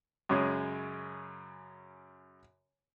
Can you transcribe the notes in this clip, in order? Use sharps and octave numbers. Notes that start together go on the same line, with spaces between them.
F#2 C#3 G#3